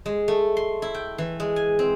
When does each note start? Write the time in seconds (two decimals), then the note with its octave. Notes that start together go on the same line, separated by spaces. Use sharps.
0.06 G#3
0.28 A3
0.57 C6
0.82 E4
0.94 G5
1.18 E3
1.40 G#3
1.56 G#5
1.79 C4